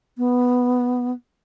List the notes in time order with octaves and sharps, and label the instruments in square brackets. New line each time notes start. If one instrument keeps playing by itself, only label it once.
[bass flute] B3